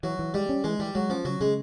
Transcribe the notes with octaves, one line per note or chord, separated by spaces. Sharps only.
E3 F#3
E3
G3 G#3
C#4
E3 G#3
E3 G3
F#3 G#3
F3 C#4
C#3 F#3
C#3 G#3